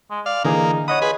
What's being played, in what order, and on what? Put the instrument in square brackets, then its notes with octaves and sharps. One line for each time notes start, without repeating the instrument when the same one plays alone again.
[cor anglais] G#3
[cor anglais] D5 [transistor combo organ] F5
[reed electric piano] D3 E3 G#4 [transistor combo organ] A#3 [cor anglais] D#4
[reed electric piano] C#5 D#5 B5 [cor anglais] F#5 [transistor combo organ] D#6
[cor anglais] F4 [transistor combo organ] G#4 B4